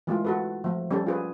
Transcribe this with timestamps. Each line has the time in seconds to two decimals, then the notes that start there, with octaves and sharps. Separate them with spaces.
0.07 E3 G#3 A3 F4
0.25 F#4 A4 B4
0.64 F3 A3
0.91 G3 C#4 A4
1.07 F4 G#4 B4